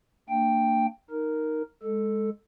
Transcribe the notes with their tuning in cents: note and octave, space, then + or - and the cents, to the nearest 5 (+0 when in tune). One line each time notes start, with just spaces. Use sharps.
A#3 -35 D4 +15 G5 +0
D#4 +0 A#4 +0
G#3 +0 A4 +0